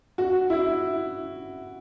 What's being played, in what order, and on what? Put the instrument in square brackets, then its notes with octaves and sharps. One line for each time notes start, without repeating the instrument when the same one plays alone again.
[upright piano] F#4
E4